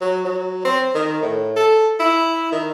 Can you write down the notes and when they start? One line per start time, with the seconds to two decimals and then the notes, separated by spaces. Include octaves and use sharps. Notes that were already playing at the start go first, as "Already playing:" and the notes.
0.01 F#3
0.25 F#3
0.65 C4
0.95 D#3
1.22 A2
1.56 A4
2.00 E4
2.52 D#3